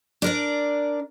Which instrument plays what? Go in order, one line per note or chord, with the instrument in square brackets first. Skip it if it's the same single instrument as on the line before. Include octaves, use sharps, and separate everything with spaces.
[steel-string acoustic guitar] D4 A#4 D5